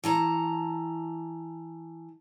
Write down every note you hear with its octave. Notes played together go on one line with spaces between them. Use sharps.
E3 A5 A#5